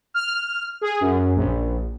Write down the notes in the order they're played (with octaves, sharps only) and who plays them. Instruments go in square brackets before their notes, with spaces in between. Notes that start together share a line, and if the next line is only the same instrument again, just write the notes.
[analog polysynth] F6
G#4
F#2
A#1